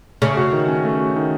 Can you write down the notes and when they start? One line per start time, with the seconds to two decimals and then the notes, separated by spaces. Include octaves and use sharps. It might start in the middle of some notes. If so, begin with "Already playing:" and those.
0.22 C#3 A3
0.37 F#4
0.53 D#3
0.68 C#4
0.84 A3
1.00 F#4
1.16 D#3